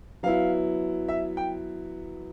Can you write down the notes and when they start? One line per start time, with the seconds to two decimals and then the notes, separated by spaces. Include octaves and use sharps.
0.23 F#3 B3 E4 F5
1.08 E5
1.37 G5